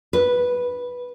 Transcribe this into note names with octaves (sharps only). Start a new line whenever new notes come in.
B4